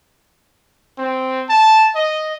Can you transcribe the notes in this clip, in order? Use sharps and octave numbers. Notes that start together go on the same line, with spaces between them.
C4
A5
D#5